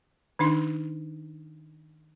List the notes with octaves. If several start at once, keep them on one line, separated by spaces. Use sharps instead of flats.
D#3 D4 D#4 C6